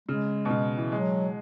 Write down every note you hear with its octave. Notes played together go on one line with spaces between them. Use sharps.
C#3 G#3
B2
C#3
E3
F#3 G#3